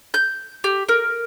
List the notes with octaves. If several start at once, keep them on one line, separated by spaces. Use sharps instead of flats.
G6
G4
A#4